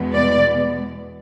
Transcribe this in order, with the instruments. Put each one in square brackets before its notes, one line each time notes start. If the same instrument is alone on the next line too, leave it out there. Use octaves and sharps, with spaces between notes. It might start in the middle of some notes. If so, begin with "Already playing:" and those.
Already playing: [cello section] E2 B2 G#3 B3
D5